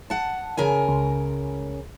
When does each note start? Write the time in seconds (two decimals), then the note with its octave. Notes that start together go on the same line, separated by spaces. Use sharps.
0.10 F#5 A5
0.57 C#3 A#4 G#5
0.89 C#2